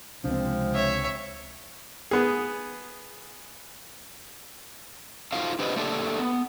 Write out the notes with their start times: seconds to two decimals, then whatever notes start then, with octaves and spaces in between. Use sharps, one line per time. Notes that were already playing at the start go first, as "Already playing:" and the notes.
0.24 C#2 C3 F3 G#3 C4 D4
0.74 C#5 E5
2.11 B3 G#4
5.32 D#4 F4 F#4 A4 C5 F5
5.59 D4 G4 B4 C5 D5 D#5
5.76 A3 A#3 D4 G4 A4
6.19 B3